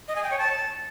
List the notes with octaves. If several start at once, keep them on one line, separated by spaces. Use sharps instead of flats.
D#5
G#5
G5
C#5
A5